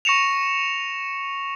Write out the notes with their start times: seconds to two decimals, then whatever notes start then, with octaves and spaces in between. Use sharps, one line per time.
0.05 C#6 A#6 C#7 E7 F7